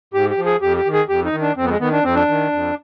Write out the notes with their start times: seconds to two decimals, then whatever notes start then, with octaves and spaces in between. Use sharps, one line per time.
0.14 G#2 G4
0.29 G4
0.37 F3
0.45 G#4
0.62 F2 G4
0.77 G4
0.85 D#3
0.93 G#4
1.09 F2 G4
1.25 D#4
1.32 D#3
1.41 D4
1.56 F2 C4
1.65 B3
1.69 G#3
1.80 D#3 B3
1.92 D4
2.04 F2 C4
2.15 D4
2.28 D#3
2.52 F2